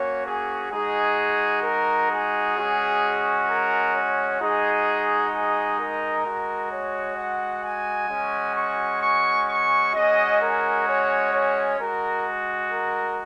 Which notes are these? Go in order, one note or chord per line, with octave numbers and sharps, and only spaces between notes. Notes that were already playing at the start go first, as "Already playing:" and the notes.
Already playing: A#3 C#4 F#4 C#5
G#4
G#3 D#4 F#4 G#4
A#4
G#4
G#3 C#4 F#4
A#4
C#5
G#3 D#4 F#4 G#4
G#4
A#4
G#3 F#4
C#5
F#5
G#5
G#3 C#4 F#4
C#6
C#6
C#6
G#3 C#4 F#4 D#5
A#4
C#5
C#5
G#3 F#4 A#4
A#4